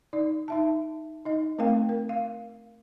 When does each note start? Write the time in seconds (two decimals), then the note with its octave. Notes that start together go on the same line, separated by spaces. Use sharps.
0.13 D#4 D5
0.48 D#4 E5 A5
1.25 D#4 D#5
1.58 A3 C4 A#4 F5 G5
1.89 A#4
2.09 F5